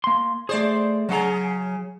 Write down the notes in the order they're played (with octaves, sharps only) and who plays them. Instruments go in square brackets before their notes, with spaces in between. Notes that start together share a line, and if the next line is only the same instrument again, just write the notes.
[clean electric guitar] A#3 C6
[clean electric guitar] A3 G#4 [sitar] C5 D5
[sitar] C#3 G#4 [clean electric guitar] F#3 F#5 A#5